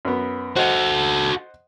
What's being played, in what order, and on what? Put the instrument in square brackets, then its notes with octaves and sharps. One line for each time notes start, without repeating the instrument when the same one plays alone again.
[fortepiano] F#2 B3
[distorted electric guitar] F#4 A4 [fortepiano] C5 D#5 F#5